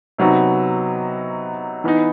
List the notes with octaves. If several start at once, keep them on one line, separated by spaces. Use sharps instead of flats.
C3 F#3 B3 D#4 F#4
E3 B3 D#4